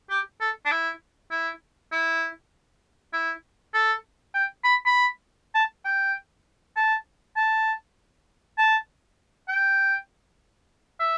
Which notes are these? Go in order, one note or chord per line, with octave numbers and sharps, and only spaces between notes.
G4
A4
D4
E4
E4
E4
E4
A4
G5
B5
B5
A5
G5
A5
A5
A5
G5
E5